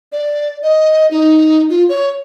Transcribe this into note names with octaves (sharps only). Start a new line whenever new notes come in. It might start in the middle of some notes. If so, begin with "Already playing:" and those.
D5
D#5
D#4
F4
C#5